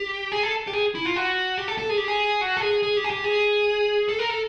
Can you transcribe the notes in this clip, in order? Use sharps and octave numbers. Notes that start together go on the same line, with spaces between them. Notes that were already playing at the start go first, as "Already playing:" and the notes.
Already playing: G4
G#4
A4
G4
G#4
E4
F4
F#4
G4
A4
A4
G#4
G4
G#4
F#4
A4
G#4
G#4
G4
G#4
G4
G#4
A4
A#4
A4